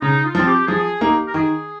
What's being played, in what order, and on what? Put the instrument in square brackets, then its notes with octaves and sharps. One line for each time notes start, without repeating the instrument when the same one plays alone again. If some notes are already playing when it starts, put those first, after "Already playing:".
[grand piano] C#3 [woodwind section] D#4
[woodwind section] F4
[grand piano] F3 C4
[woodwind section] G4
[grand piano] F3 [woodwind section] G#4
[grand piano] A#3 D#4 [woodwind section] G4
[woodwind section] A#4
[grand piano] D#3 [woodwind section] G#4